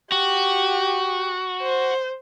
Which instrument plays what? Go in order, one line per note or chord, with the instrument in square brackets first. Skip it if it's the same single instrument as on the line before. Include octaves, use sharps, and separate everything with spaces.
[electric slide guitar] F#4 [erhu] G4
[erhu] C5